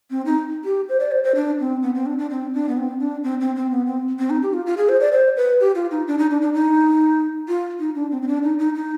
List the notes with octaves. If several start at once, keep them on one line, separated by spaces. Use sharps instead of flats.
C4
D#4
G4
C5
D5
C5
C5
D4
C4
B3
C4
D4
D4
C4
D4
B3
C4
D4
C4
C4
C4
B3
C4
C4
D#4
G4
F4
F4
G#4
C5
D5
C5
B4
G4
F4
D#4
D4
D#4
D4
D4
D#4
F4
D#4
D4
C4
C4
D4
D#4
D#4
D#4